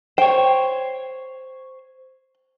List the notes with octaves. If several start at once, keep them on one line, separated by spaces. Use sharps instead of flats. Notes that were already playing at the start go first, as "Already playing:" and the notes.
C5 C#5 G5